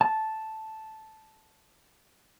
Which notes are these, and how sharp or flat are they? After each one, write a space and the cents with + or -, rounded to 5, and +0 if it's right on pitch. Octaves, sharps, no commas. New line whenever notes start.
A5 -5